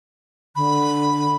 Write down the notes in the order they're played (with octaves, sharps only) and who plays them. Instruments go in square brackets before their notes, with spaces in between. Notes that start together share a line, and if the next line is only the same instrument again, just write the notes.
[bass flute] D3 [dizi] B5